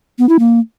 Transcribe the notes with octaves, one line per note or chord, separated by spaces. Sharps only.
B3
E4
A#3